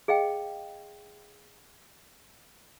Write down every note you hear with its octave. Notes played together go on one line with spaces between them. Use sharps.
G#4 D#5 F5 G5